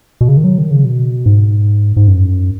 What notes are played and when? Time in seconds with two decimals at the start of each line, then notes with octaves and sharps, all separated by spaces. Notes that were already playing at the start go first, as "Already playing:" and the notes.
0.21 B2
0.28 C#3
0.37 D#3
0.44 F#3
0.58 D#3
0.71 C#3
0.85 B2
1.26 G#2
1.96 G#2
2.08 F#2